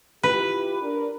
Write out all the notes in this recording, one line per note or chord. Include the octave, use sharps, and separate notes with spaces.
E4 F4 G4 B4
D4 A#4